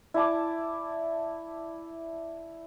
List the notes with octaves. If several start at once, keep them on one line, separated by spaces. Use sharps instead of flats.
E4 D5 A5 D6